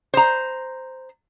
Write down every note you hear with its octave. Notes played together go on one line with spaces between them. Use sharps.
C5 A#5